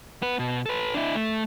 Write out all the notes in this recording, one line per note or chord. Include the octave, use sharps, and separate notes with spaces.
B3 B4
B2
A4 B4
D4 E4
A3